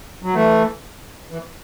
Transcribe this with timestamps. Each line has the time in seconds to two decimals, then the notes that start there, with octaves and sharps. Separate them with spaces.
0.23 F#3
0.34 E3 A3
1.31 E3